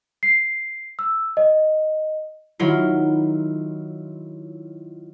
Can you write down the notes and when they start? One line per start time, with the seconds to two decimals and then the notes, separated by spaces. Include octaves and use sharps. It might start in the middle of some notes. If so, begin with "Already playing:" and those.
0.23 C7
0.99 E6
1.37 D#5
2.59 D#3 F#3 E4 F4